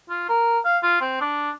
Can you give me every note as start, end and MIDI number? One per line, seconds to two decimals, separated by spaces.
0.10 0.26 65
0.29 0.59 70
0.65 0.78 77
0.83 1.01 65
1.01 1.19 60
1.21 1.51 62